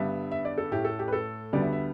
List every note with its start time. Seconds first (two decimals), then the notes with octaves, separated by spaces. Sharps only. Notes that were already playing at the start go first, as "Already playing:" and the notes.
Already playing: G2 D3 G3 B3 E5
0.31 E5
0.45 D5
0.58 A4
0.72 A2 A3 G4
0.85 A4
0.99 G4
1.08 B4
1.13 A4
1.53 D2 D3 G3 B3 D5
1.62 E5
1.73 E5